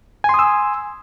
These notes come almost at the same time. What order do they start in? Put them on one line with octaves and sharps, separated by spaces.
G#5 C6 D#6 E6